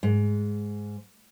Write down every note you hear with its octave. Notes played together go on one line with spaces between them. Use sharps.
G#2